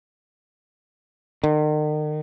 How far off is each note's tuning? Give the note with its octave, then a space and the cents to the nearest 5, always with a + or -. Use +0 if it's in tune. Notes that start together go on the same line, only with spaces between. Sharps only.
D#3 -40